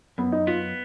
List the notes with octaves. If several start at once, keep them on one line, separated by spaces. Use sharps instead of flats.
F#2 B3
D#4
B3 F4